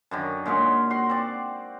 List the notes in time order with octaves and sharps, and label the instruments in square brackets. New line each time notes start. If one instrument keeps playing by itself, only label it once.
[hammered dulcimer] F#2 D3 D#3
A#2 G#3 C#4 F#4
F#4 C6
C4 D5